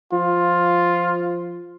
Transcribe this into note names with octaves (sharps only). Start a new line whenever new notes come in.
F3 F4